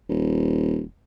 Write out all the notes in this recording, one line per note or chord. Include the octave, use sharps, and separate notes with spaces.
D#1